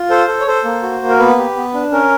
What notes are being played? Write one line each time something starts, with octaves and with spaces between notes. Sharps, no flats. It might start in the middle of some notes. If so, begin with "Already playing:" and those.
Already playing: F4
A4 C5
A4
C#5
A4 C5
A#3
F#4
A#3
A#4
B3 B4
G4
B3
D4
C#4 A#4